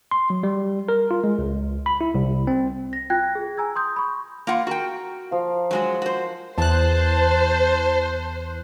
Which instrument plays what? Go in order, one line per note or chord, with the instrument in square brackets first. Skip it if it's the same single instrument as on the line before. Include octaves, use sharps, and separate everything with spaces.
[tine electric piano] C6
F#3
G3
A#4
F4
G#3
C#2
B5
E4
C2
C4
[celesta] A#6
F4 G5 F#6 G#6 A#6
G#4
G#5 A#5 E6 G#6
C6 D#6 G6
B5 C#6
[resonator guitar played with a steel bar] A#3 F4 F#5
[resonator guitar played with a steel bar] F#4 G5 [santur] A#4 C#6
[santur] F3 F5
[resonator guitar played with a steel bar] F#3 G#3 F#4 [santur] C#5
[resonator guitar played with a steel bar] F#4 C5
[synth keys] E2 F#6 [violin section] C5 [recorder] A5